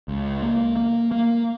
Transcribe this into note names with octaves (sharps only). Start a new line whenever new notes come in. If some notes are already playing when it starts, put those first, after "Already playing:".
C#2
A#3
A#3
A#3